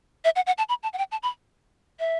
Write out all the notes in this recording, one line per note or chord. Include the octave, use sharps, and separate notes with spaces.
E5
F#5
F#5
A5
B5
A5
F#5
G5
A5
B5
E5